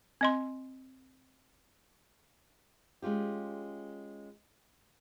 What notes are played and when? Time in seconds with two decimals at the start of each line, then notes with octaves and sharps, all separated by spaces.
0.21 C4 D#5 C6
3.02 G#3 C#4 F4 G4